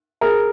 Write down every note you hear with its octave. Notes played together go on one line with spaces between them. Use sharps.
G#4 A#4